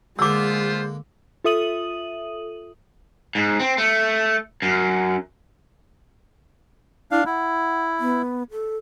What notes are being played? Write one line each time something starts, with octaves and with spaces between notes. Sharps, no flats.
D3 G#3 A#3 B3 F4 C5 D6 E6
F4 A4 E5 D#6 D#7 F#7
G#2
C4
A3
F#2
D4 E4 F5
E4 F#5
B3
A4